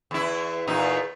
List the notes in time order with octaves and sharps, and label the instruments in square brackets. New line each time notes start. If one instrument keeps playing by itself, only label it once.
[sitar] E2 E4
E2 A#2 D#4